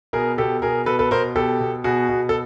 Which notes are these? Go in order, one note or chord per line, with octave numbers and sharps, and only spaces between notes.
B2 G#4 A#4
B2 G4 A4
B2 G#4 A#4
B2 A4 B4
A4 B4
B2 A#4 C5
B2 G4 A4
B2
B2 F#4 G#4
B2
A4